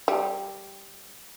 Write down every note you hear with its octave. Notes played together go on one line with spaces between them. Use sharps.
G3